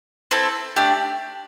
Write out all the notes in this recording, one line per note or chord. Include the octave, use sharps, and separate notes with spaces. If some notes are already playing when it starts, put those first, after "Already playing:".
C4 E4 A4
A3 D4 G4